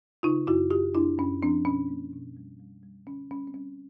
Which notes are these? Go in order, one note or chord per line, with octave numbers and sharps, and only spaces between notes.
C#3 D#4 F4
F#2 E4 F#4
F#2 F4 G4
F#2 D4 E4
F#2 C#4
F3 C4 D4
B2 C#4
A#3
B2
G3
G3
G3
D3 C#4
G3 C#4
C4
G3 C#4